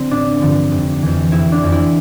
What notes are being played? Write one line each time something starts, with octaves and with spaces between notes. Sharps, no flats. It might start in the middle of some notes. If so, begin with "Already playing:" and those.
Already playing: D3 F3 C4
A1 D4
G2 D3 F3
F1
F2 E3
F1 E4
D4
F2 E3
E4